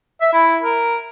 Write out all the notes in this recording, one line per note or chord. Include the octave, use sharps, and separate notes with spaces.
E5
E4
A#4